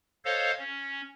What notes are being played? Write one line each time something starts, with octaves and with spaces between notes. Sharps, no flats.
A4 C5 C#5 D#5 F5
C#4